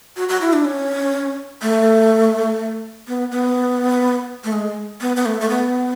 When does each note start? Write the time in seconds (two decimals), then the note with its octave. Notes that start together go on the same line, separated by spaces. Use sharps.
0.17 F#4
0.29 F#4
0.41 E4
0.53 D4
0.65 C#4
1.62 A3
3.07 B3
3.32 B3
4.44 A3
4.53 G#3
5.01 B3
5.16 B3
5.26 A3
5.41 A3
5.49 B3